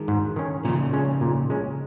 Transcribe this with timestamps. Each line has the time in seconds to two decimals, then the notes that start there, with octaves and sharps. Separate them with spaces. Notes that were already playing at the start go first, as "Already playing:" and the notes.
Already playing: D#3 G#3
0.08 G#2
0.36 D#3 C#4
0.65 A#2 C#3 F3
0.93 G#3 C#4
1.21 A#2
1.50 G#3 C#4